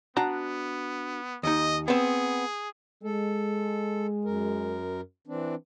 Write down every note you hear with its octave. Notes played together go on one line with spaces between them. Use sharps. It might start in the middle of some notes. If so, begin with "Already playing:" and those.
B3 D4 F#4 A#5
D#2 D#4 D#5
B3 C4 G#4
G#3 A4
F#2 A#4
E3 C4 D4